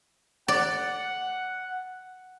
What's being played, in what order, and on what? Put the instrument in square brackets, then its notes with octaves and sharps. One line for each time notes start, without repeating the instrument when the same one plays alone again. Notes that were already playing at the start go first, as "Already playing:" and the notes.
[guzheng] D5 [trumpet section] F#5